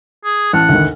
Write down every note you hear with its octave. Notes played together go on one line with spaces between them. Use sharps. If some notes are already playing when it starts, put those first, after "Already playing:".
G#4
A1 F#5 A5 F6
G#1 D2